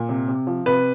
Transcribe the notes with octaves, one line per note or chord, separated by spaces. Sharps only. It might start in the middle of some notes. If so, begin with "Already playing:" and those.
Already playing: A#2
C3
C3
F3
C3 B4